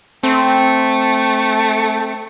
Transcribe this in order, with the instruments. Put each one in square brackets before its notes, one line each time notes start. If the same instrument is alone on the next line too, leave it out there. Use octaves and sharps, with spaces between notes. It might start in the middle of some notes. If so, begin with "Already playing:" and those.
[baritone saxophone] A3 [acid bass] C4